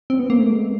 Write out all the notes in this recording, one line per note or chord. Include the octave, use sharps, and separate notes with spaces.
C4
B3
A#3
A3
G#3